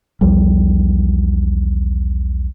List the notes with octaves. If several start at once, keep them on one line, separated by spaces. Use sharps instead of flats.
B1 E2 F3 G3